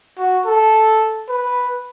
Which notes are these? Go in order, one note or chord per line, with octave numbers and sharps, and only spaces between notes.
F#4
A4
B4